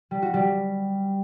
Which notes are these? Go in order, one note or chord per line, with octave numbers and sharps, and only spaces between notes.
G3
F#4
G3